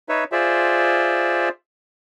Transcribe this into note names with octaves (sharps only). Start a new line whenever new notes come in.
D#4 B4 C#5 E5
F4 G#4 C5 D5 E5